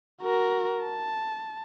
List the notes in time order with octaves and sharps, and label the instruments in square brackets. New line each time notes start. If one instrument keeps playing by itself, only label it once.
[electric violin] F#4 A#4
A5